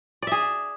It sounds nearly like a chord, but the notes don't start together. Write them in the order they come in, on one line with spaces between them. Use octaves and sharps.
D5 E5 G#4